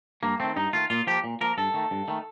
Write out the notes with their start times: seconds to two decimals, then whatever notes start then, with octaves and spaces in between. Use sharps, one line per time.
0.23 G2 A#3
0.40 D#3 A3 C4
0.56 G2 D#4
0.73 D#3 A3 F4
0.90 A#2 F4
1.07 F3 A#3 G4
1.24 A#2
1.41 F3 A#3 A#4
1.58 G2 A4
1.74 D#3 A3
1.91 G2
2.08 D#3 A3